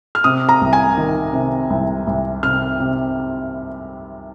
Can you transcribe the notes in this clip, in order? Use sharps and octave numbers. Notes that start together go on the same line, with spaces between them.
F6
C3 D#6
A#5
C2
G#5
D#3
C3
C2
C2
C3 F6
C3